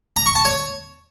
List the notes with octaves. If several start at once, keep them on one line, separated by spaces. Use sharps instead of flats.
A#5
C#6
A5
C#5